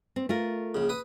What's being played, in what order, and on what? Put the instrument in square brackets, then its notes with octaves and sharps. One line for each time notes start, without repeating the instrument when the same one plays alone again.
[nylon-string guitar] C4
A3 F4 A#4
[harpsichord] A#1 C#3
B4 D#6